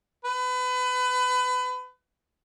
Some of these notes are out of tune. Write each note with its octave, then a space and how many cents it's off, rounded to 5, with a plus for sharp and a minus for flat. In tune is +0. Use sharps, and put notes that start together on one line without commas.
B4 +30